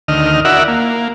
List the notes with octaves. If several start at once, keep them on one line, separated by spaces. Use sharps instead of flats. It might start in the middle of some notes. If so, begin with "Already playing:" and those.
D2 D#3 D#5 F6
E4 F#4 A#4 D5 E5 F#5
A#3